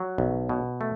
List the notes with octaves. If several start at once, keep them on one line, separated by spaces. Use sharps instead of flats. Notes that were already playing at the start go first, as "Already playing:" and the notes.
Already playing: F#3
B1
B2
A3